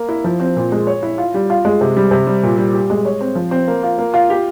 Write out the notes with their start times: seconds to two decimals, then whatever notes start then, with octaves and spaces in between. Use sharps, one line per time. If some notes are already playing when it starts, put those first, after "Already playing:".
Already playing: A#3
0.09 E4
0.24 F3
0.40 C4
0.56 A#2
0.72 G#3
0.87 C#5
1.03 E4
1.18 F4
1.34 G3
1.50 F4
1.65 G#3
1.81 C3
1.96 G3
2.11 C3
2.26 G3
2.43 A#2
2.58 G3
2.74 G4
2.90 G#3
3.05 C#5
3.21 C4
3.35 F3
3.51 C4
3.68 A#3
3.83 F4
3.98 A#3
4.14 F4
4.30 G4